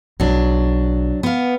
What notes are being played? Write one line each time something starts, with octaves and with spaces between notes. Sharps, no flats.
B1 F#3 D4
B3 F5